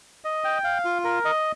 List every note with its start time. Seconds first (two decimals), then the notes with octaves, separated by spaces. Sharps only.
0.24 D#5
0.44 G5
0.64 F5
0.85 F4
1.04 A#4
1.25 D#5